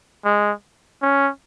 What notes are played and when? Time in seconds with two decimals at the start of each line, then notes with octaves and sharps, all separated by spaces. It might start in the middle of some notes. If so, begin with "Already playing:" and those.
0.25 G#3
1.02 C#4